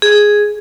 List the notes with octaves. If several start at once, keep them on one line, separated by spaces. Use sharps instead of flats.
G#4